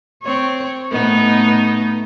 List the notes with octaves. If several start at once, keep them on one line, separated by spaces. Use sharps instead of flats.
C4 C#5
A2 B3 D#4